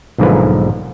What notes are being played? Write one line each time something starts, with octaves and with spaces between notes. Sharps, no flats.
B1 G#2 D3 F3 A#3 B4